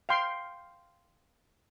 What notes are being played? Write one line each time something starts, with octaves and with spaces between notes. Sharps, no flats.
F5 G5 C6